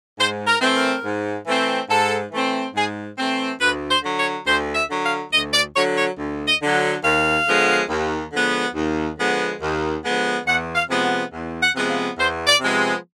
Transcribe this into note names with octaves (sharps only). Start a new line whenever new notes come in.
G#2 C5
A#4
E3 A3 C4
A#4
G#2
E3 A3 C4
G#2 A4
E3 A3 C4
G#2 G#4
E3 A3 C4
D2 B4
C5
D3 F#3
C#5
D2 C5
E5
D3 F#3
F5
D2 D#5
D5
D3 F#3 C#5
C#5
D2
D#5
D3 F#3
D#2 F5
D3 F3 G#3 B3
D#2
D3 F3 G#3 B3
D#2
D3 F3 G#3 B3
D#2
D3 F3 G#3 B3
E2 F#5
F5
C3 F3 G#3 B3
F#5
E2
F#5
C3 F3 G#3 B3
F5
E2 C5
D5
C3 F3 G#3 B3